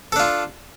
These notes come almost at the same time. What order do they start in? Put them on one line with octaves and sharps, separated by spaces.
A4 D4 F4